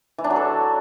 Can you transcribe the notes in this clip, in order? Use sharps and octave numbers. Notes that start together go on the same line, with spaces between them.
E3
D4
F#3
A4